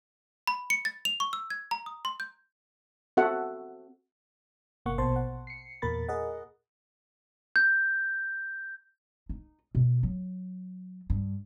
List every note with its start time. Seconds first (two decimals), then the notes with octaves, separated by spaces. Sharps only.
0.47 B5
0.70 C#7
0.85 A6
1.05 F7
1.20 C#6
1.33 E6
1.50 G#6
1.71 A#5
1.86 D#6
2.05 C6
2.20 G6
3.17 C4 F#4 A4 E5 F#5
4.86 G1 C3 A#3 F#5 C#6
4.98 A#1 B2 C5 A5 C6
5.16 F#5
5.47 C7 C#7
5.82 E2 A#2 A#3 A#4 B5 A6
6.09 G#4 A#4 D#5 F#5
7.56 G6
9.29 D#4
9.75 B2
10.03 F#3
11.10 G2